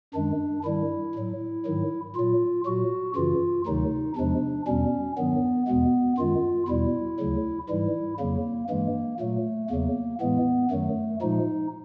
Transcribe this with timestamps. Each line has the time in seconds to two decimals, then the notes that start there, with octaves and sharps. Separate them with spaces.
0.14 F#2 D#3 G#3 D4
0.65 G2 D#3 G3 E4
1.15 A2 F#3
1.65 G#2 D#3 F#3
2.16 A#2 F#3 F4
2.66 A#2 F#3 F#4
3.16 F#2 C#3 E3 F4
3.66 D2 C3 D#3 F#3 D#4
4.16 E2 C3 F3 G#3 D4
4.67 E2 B2 G3 C#4
5.18 G2 D#3 F#3 B3
5.67 E2 B2 G#3 B3
6.18 F#2 D#3 G#3 F4
6.68 E2 B2 G3 E4
7.19 D2 C#3 F#3
7.69 G#2 E3 G3 E4
8.19 F2 C#3 F#3 A#3
8.70 G2 E3 G#3 A#3
9.20 A#2 F#3 A3
9.70 E2 C#3 F#3 A#3
10.21 A2 E3 G#3 B3
10.71 F#2 D#3 F#3 A3
11.21 A#2 F3 G#3 D#4